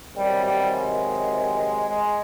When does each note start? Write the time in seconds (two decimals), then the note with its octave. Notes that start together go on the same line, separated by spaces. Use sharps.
0.15 C3 D#3 F#3 G3
0.43 G3
0.72 G#3
1.86 G#3